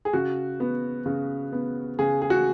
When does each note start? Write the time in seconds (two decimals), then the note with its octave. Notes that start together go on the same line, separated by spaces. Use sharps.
0.05 G#4
0.13 C#3 F#4
0.60 B3
1.06 C#3
1.53 B3
1.99 C#3 G#4
2.22 G#4
2.30 F#4